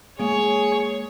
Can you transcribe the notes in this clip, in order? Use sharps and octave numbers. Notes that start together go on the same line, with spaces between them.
G#3 A#3 G#4 C#5